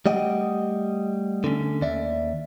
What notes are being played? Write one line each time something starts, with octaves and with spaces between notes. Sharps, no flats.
G3 A3 D#5 F#5 G5
D3 A3 C4 C#4
D#2 D5 E5